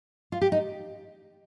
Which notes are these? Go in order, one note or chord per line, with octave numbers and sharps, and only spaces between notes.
F4
G4
D#4